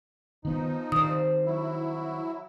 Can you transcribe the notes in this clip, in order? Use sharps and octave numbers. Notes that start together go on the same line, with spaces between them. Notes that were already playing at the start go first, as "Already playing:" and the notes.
D#3 F3 B3 D#4
D#3 G3 C4 D#6
F#3 E4